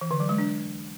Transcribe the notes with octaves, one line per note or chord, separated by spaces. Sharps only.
E3
D3
F#3
G#3
D4